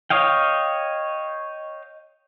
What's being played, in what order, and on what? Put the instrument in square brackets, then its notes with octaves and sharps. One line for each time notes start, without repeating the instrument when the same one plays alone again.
[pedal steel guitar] C#5 D#5 F5 G5